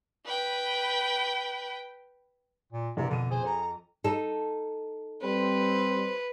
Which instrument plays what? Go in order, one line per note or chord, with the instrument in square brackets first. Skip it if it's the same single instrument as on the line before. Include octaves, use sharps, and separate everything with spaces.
[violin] B4 G5
[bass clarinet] A#2
[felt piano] A#1 [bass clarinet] C3 [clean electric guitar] E3 A#5
[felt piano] F2 D#7 [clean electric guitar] B2 [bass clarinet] D3
[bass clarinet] G#4 [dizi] C5
[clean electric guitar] A4 [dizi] A#5
[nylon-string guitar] D#4 A4
[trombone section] G3 C4 [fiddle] B4 [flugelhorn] C5